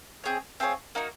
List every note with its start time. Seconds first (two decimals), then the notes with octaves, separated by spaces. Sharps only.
0.24 C4 F4 G#4 C#5
0.60 C4 F4 G#4 C#5
0.95 A#3 D#4 F#4